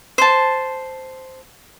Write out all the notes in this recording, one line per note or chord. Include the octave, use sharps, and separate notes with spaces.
C5 A5